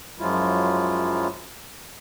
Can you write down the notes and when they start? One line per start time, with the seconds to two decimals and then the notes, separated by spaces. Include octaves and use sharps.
0.19 F#2 F3 F#3 G#3 E4 F4